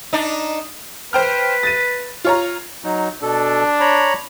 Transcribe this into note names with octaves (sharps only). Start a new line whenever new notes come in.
D4 D#4
B4 C5 G5 F6
A6 D#7
F4 C#5 A#5
F#3 D#4
B2 D4 A4
C#5 A#5 B5